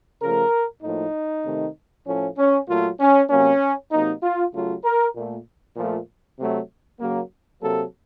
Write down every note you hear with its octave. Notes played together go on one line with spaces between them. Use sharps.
C#3 F3 A3 A#4
A2 F3 A#3 D#4
C3 D#3 A3
A2 F3 A3 C#4
C#4
A#2 F#3 A3 F4
C#4
C3 F#3 A#3 C#4
C3 F#3 A#3 D#4
F4
C#3 F#3 A3 F4
A#4
A#2 A3
A#2 F3 A3
C3 F#3 A3
C#3 F#3 A#3
C3 F#3 A#3 A4